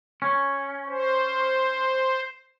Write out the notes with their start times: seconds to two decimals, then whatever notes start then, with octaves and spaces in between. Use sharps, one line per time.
0.22 C#4
0.87 C5